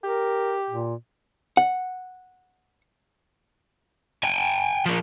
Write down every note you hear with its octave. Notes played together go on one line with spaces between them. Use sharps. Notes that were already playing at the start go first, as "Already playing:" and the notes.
G4 A#4
A#2
F#5
G5 G#5
F3 A#3